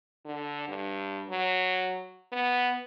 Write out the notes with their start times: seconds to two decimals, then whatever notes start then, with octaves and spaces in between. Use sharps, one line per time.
0.25 D3
0.68 G2
1.29 F#3
2.32 B3